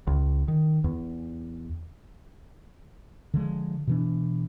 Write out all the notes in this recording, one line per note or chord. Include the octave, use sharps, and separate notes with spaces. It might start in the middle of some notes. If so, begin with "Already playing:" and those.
C#2
D#3
E2
D3 F3 G#3
B2 E3 D4